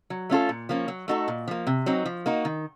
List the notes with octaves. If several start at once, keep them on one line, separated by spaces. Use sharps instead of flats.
F#3
A3 C#4 F4 A4
A#2
F3 A#3 C#4
F#3
A3 D#4 F#4 A4
A#2
F3 A#3
C3
F#3 C4 D#4
F3
A#3 D#4 F#4
D#3